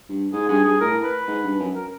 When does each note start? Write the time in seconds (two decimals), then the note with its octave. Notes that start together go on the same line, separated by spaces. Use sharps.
0.09 G2
0.33 G#2 G#4
0.49 G2 G#4
0.64 G2 G#4
0.80 A2 A#4
1.04 B4
1.27 G#2
1.44 G2
1.60 F#2
1.75 A#4